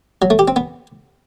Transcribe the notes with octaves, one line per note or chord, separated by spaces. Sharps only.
F#3
A3
G4
C4
B3